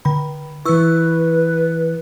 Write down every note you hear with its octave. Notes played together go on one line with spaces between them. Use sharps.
D3 B5
E3 E4 B4 C#6 E6